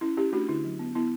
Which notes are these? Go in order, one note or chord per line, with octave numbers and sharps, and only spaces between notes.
C#4 E4
C#4 E4 G4
A3 D4 F#4
D3 E4
F#3
B3
B3 E4